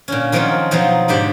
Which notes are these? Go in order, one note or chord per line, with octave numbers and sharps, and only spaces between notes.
A#2 D3 C#4
D#3 F3 F#3 C4 C#4 F4
B2 F3 F#3 C4 D#4
G#2 D3 G4 C5 D5